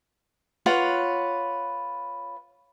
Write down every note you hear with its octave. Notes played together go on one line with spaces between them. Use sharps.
F4 B4 C#5 F#5